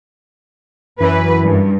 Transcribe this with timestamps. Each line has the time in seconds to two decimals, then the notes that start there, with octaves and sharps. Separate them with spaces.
1.00 F#2 E3 B4
1.43 G2